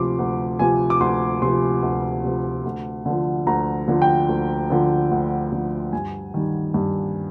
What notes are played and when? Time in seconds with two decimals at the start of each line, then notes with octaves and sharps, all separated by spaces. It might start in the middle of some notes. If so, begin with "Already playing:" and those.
Already playing: D2 C3 F3 C6 D6
0.19 D2
0.59 C3 F3 G#5
0.90 D6
1.00 D2 C6
1.42 C3 F3 C6
1.82 D2
2.24 C3 F3
2.65 D2
3.06 D3 F3
3.47 D2 A#5
3.88 D3 F3
4.02 G5
4.29 D2
4.70 D3 F3
5.11 D2
5.52 D3 F3
5.93 G2 G#5
6.34 D#3 G3
6.74 G2